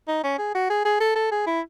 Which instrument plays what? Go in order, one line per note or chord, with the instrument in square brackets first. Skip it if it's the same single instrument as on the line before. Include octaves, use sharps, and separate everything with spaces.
[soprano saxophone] D#4
C#4
G#4
F#4
G#4
G#4
A4
A4
G#4
E4